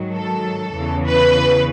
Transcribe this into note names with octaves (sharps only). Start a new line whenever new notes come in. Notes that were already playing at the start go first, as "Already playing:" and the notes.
Already playing: G#2 D#3 F#3
A4
E2 C#3 E3
B4